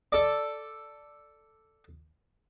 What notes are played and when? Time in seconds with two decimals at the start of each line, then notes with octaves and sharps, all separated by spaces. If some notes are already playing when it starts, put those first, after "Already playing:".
0.12 A4 D5